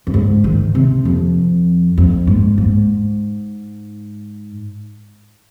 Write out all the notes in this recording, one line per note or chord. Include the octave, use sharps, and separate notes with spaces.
F2
G#2
D#3
C3
F2
F2
G#2
G#2